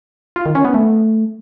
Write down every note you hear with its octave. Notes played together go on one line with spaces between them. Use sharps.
F4
D#3
C#4
B3
A3